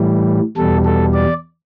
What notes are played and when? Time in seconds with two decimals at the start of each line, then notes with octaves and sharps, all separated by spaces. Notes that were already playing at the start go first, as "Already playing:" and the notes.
Already playing: A2 E3 G3
0.57 E2 B2 G3 A4
0.85 A4
1.13 D5